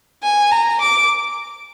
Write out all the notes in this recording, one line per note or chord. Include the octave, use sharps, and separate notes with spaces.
G#5
A#5
D6